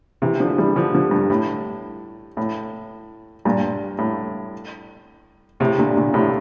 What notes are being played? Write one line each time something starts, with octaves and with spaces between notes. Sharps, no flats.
C3 E3
D3 F3
E3 G3
D3 F3
D3 F3
G2
A2
A2
G2 A#2
A2
A2 C3
A#2 D3
A#2 D3
A2 C3